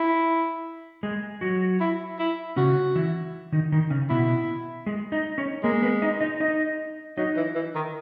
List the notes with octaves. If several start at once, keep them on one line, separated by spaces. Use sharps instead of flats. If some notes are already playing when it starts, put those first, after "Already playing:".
Already playing: E4
G#3 G#4
F#3 F#4
E4
E4
C#3 C#4 F#4
E3 E4
D#3 D#4
D#3 D#4
C#3 C#4
B2 B3 E4
G#3 G#4
D#4 D#5
C#4 C#5
G#3 A#3 A#4
B3 B4
D#4 D#5
D#4 D#5
D#4 D#5
F#3 D#4 D#5
E3
E3
D#3